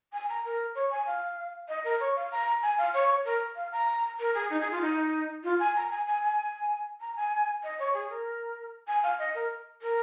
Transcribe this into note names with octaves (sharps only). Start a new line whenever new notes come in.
G#5
A#5
A#4
C#5
G#5
F5
D#5
A#4
C#5
F5
A#5
G#5
F5
C#5
A#4
F5
A#5
A#4
G#4
D#4
G#4
F4
D#4
F4
G#5
A#5
G#5
G#5
G#5
A#5
G#5
D#5
C#5
G#4
A#4
G#5
F5
D#5
A#4
A#4